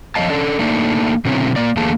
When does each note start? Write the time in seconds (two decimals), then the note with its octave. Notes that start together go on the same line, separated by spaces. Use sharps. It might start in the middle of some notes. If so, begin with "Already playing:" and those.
0.15 F3 C4 C#5 D#5 F5 A5
0.30 C#4 D4 A4 D5
0.59 A3 A#3 D4 D#4
1.25 B2 D3 F#3 C4 C#4 E4
1.56 A#3 D5
1.77 E2 D3 A3 A#3 G#4 A5